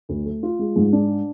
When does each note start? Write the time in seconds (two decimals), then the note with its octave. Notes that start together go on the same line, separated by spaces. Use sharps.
0.09 D2
0.26 A3
0.43 F4
0.59 G#3
0.76 G#2
0.93 D4